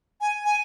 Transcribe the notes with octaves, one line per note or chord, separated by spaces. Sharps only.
G#5
G#5